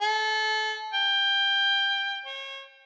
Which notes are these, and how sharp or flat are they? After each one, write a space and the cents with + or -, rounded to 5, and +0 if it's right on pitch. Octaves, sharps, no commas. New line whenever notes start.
A4 -25
G5 +20
C#5 -30